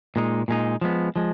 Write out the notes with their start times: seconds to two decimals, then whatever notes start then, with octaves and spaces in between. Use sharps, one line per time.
0.16 A#2 G#3 D#4
0.48 A#2 G#3 D#4
0.81 F3 G#3 B3
1.16 F3 G#3